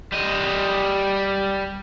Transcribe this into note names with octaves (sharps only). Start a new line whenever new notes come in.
G3 D#5